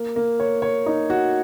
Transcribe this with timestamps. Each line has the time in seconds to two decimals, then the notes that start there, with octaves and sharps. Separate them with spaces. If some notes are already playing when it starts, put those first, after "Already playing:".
Already playing: A#3
0.16 A#3
0.40 C#5
0.62 C#5
0.86 D#4
1.10 F#4